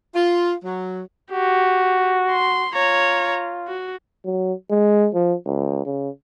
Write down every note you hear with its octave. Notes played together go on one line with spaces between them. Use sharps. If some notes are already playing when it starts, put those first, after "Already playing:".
F4
F#3
F#4 G4
C6
F4 C#5 A#5
F#4
F#3
G#3
F3
C#2
C#3